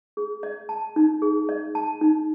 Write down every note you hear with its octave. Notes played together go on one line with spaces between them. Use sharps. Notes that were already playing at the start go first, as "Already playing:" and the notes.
G#4
D#5
A5
D#4
G#4
D#5
A5
D#4